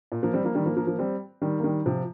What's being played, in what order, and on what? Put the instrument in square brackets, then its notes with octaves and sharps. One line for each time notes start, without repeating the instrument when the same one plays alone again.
[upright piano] A#2
F3 A#3
G3 C4
F3 A#3
D#3 G3
F3 A#3
F3 A#3
F3 A#3
G3 C4
D#3 G3
A#3
D#3 G3
C3 F3